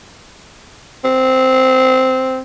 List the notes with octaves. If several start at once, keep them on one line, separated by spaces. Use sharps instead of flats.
C4